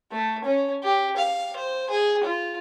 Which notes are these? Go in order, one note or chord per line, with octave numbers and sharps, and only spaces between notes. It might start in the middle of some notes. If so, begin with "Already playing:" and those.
A3
C#4
G4
F5
C5
G#4
F4